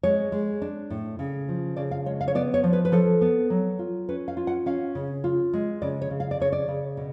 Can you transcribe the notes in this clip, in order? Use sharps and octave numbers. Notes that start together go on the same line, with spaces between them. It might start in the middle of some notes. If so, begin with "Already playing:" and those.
G#3 C#5
G#3
D4
A2
C#3
F3
C#3 D5
F5
G#3 C#5
F5
C#5
B3 D5
C#5
F3
B4
B4
F3 A4
B3
F#3
F4
C#4 B4
F5
F4
F#5
C#4 F5
C#3
F4
G#3
C#3 D5
C#5
C#3
F5
D5
C#3 C#5
D5
C#3
B2